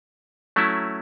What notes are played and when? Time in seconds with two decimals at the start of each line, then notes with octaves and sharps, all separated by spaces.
0.56 F#3 A3 C#4 E4